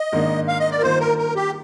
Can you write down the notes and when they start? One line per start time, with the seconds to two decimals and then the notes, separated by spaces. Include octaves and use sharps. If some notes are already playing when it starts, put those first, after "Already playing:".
Already playing: D#5
0.12 G#2 D#3 A#3 D4
0.48 F5
0.59 D#5
0.71 D5
0.77 A#4
0.82 G2 D#3 A#3 F4 C5
1.00 A#4
1.18 A#4
1.35 G4